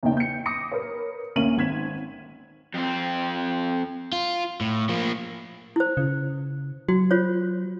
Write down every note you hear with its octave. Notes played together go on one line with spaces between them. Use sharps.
E2 A#2 C#3 D#4 G5
G6 C#7
D6 D#6 A#6 C#7
A#4 B4 C#5
D2 A#2 A#3 C#4 D#7 F#7
G#1 C4 G#6 B6 E7
F2 C4
F4
A2
F3 A#3
E4 C5
C#3
F#3 F#4
F4 C5 C#5